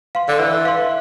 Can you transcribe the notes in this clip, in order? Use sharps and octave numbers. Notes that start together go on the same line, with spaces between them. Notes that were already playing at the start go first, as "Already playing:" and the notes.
F5 C6
D3
E3 B4
F5 C6